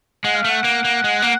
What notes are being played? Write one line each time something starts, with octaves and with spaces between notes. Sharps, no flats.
G#3 F#5
F5
A3
F#5
A#3
A#3
G#3
A#3